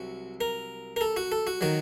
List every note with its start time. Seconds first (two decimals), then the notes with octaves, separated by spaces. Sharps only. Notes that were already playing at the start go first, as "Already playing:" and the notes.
Already playing: C2 C3 F#3 F#4
0.41 A#4
0.96 A#4
1.01 A4
1.17 F#4
1.32 A4
1.47 F#4
1.61 D#3 F#3 F#4